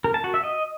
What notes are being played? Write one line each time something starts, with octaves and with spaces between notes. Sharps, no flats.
A#4
A5
F#4
E5
D#5